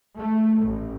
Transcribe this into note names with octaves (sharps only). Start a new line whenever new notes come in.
A3
A1